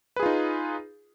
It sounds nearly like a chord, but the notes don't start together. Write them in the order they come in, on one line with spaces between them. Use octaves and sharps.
B4 G#4 F4 D#4